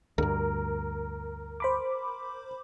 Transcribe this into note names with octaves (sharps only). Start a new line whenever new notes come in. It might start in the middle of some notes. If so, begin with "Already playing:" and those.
D2 G2 A#4
C5 B5 D6